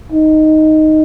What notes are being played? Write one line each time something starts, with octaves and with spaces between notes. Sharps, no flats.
D#4